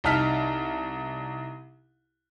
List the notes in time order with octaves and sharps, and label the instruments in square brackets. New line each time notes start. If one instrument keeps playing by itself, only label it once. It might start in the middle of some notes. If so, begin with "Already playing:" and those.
[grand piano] C2 D#4 A5 F6 B6